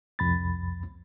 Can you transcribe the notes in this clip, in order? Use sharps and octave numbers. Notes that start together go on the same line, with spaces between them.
C2 F2 B5 A6